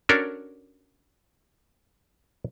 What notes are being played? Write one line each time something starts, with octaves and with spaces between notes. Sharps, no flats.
C#4 D4 F#4 A4 A#4